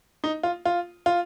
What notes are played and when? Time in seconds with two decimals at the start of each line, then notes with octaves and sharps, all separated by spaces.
0.24 D#4
0.43 F4
0.65 F4
1.06 F4